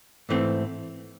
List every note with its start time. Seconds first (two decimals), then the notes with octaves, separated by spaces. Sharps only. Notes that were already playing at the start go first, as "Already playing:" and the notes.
0.29 G#2 E3 A3 C4